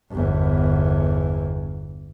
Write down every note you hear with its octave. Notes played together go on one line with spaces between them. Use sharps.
G1 E2